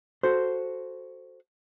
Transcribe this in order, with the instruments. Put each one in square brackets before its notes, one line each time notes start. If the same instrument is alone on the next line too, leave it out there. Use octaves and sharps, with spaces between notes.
[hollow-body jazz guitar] F#4 A4 C5